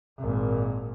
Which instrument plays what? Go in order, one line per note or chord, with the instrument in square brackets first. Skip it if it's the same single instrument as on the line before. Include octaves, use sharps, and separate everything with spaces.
[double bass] G#1 A#2